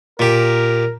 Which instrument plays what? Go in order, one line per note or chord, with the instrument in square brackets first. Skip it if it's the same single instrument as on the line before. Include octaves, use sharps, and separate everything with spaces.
[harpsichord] A#2 G4 [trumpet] A#4